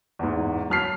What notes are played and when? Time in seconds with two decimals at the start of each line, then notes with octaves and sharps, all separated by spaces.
0.19 E2 G#2
0.70 F#3 A5 F6 B6 C7